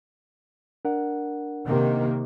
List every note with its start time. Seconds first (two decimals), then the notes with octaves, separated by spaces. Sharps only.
0.85 D4 A#4 F#5
1.66 C3 D#3 A#3